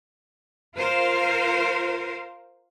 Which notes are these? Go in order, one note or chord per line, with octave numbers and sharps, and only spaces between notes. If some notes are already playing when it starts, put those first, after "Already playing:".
F4 A#4 C5 F5